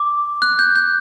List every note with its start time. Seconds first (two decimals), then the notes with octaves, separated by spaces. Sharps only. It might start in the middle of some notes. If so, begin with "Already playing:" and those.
Already playing: D6
0.42 F#6
0.59 G6
0.76 G6